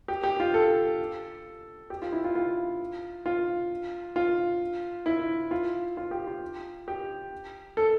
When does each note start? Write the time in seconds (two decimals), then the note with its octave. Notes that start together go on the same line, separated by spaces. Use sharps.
0.08 G4
0.23 G4
0.40 F4
0.54 A4
1.90 G4
2.02 F4
2.12 E4
2.24 F4
2.35 F4
3.26 F4
4.16 F4
5.06 E4
5.51 F4
5.97 F4
6.11 G4
6.27 F4
6.88 G4
7.77 A4